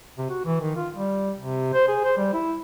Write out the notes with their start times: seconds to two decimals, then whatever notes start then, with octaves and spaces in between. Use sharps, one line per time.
0.18 C3
0.30 F#4
0.45 E3
0.61 D#3
0.76 F4
0.94 G3
1.38 C3
1.74 C5
1.88 G#4
2.04 C5
2.17 G3
2.33 E4